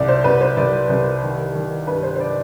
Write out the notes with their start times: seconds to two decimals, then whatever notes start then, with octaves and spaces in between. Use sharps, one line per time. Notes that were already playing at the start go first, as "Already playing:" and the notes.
Already playing: C2 D5
0.08 C5
0.24 C2 B4
0.41 C5
0.57 C2 D5
0.90 C2
1.22 D#3
1.55 D#3
1.87 G2 B4
2.03 C5
2.16 C5
2.20 D5